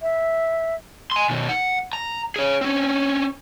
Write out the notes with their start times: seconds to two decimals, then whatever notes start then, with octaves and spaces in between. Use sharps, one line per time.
0.01 E5
1.12 G#5 C6
1.30 B2 D#3
1.49 F#5
1.93 A#5
2.36 G#4 C#5
2.61 C4 C#4